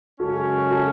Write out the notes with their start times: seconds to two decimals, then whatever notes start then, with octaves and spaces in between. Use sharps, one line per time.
0.20 F#2 C#3 G#3 C#4 F#4 A4
0.70 F#4 A4